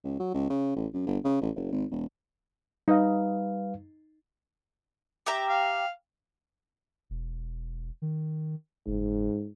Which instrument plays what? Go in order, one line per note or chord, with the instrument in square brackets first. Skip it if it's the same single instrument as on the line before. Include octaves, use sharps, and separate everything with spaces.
[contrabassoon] C#2
F#3
C#2
C#3
A1
F#2
G1
C#3
A1
F#1
G#1
E1
[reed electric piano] G3 B4 F5 [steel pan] D#4 D#5
[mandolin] G4 E5 A#5
[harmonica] F5
[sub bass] E1
D#3
[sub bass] F#1 [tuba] G#2